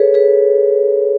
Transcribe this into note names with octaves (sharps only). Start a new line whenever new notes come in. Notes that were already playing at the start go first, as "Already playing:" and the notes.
Already playing: G#4 A4 B4 C#5
G#4 B4